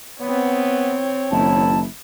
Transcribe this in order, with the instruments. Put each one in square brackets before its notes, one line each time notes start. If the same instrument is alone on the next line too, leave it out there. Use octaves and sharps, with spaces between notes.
[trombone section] B3 [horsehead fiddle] C4 C#5
[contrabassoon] F#1 [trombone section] D#3 E4 [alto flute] A5